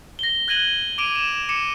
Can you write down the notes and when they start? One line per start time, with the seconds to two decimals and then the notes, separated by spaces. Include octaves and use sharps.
0.19 A#6 G7
0.48 F#6 G#6 A#6 D#7 F#7 G7
0.98 D6 D7 D#7 F7
1.15 E7 F7
1.49 D6 C#7 E7